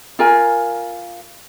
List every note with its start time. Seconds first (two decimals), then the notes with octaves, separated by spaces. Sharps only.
0.19 F4 A#4 G#5